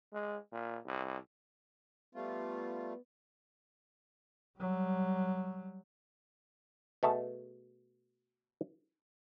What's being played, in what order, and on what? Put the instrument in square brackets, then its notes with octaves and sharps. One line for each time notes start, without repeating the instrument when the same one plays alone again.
[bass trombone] G#3
A#2
C2
[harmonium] G3 A3 F4 [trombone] B3
[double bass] F#3 G3
[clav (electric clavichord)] B2 A3 G#4 A5